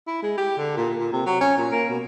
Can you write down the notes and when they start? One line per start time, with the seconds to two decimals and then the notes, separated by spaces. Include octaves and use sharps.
0.07 E4
0.22 G#3
0.37 G4
0.57 D3
0.77 A#2
0.99 A#2
1.12 C3
1.26 F#3
1.41 C#4
1.58 A#2
1.71 A#3
1.89 B2